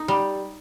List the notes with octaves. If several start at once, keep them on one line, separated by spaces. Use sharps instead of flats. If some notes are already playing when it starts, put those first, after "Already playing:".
Already playing: D#4
G3